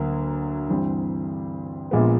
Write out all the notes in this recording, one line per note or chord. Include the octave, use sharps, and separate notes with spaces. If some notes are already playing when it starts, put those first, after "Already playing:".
Already playing: D2 D3 F#3 A#3
G2 E3 G3 C4
A#1 A#2 F3 G#3 B3